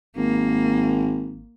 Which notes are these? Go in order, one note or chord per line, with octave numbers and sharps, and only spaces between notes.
G#1 A#3